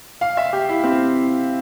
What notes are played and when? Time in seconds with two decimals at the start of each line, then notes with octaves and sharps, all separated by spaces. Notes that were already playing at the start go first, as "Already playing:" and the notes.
0.21 F5
0.37 E5
0.53 G4
0.69 E4
0.84 C4